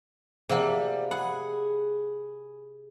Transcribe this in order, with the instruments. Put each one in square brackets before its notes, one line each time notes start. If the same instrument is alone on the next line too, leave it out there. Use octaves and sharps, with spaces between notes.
[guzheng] C3 F3 A#3 [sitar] G3 [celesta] G#4 F5 F#5
[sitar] G#4 [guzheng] F#5 [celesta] B5